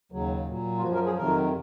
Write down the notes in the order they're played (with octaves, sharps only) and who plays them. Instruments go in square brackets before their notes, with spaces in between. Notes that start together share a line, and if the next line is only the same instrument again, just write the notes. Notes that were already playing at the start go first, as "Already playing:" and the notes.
[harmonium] D#2 C#3 F#3
A#2 F#3
F4
F#2 F3 F#4
A#4
G#4
F2 C3 D#3 F#3 A#4